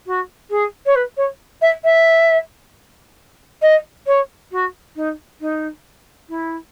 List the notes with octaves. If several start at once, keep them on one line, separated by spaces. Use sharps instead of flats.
F#4
G#4
C#5
B4
C#5
E5
E5
D#5
C#5
F#4
D#4
D#4
E4